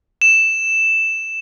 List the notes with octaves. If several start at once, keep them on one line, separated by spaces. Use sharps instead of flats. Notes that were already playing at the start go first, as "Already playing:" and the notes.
E7